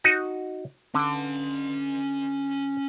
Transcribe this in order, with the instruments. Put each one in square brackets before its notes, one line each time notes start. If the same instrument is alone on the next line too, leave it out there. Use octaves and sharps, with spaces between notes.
[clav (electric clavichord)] D#4 F#4 D#5
[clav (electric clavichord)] D3 [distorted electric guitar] C#4 C6